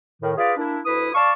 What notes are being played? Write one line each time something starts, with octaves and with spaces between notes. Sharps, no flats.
A2 D#3
F4 G#4 B4 D5 F5
A#3 D4 E4
D2 E4 B4 D#6
D5 F5 A5 C#6